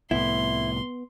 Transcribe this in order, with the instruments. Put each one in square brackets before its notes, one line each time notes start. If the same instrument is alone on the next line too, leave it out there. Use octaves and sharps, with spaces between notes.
[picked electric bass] C2 A2 [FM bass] B3 [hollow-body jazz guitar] E4 [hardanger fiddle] C6